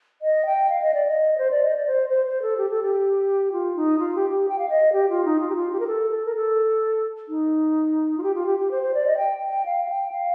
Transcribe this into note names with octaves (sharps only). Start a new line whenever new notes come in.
D#5
G5
F5
D#5
D5
D#5
C5
D5
D#5
D5
C5
C5
C5
A4
G4
A4
G4
F4
D#4
F4
G4
G4
G5
F5
D#5
G4
F4
D#4
F4
G4
F4
G4
A#4
A4
A4
A#4
A4
D#4
F4
G4
F4
G4
G4
C5
C5
D5
D#5
G5
G5
F5
F5
G5
F5